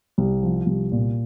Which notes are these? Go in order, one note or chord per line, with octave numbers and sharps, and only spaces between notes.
C2
F3
C2
A#2